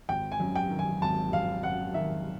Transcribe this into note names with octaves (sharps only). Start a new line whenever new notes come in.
G#1 G5
G#5
F#2
G5
D#3
G#5
G#1 A5
G#1 F5
F#2 F#5
D#3 E5